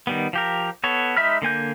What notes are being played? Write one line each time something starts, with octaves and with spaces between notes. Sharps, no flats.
D#3 G3 B3
F3 G4 A#4
B3 A4 C#5
G#3 D#4 E5 B5 F6
D3 A#3 G#5 G6